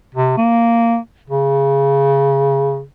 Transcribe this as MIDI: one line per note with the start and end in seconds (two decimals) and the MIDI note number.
0.15 0.33 48
0.37 0.97 58
1.30 2.84 49